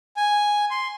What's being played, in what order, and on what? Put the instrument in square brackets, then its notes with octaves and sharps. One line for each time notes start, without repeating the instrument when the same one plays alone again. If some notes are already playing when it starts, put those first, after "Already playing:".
[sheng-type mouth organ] G#5
C6